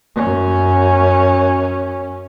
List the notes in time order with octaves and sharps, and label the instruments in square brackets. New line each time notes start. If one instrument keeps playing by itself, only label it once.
[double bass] F#2 C#4